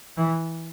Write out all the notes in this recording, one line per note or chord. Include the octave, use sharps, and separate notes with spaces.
E3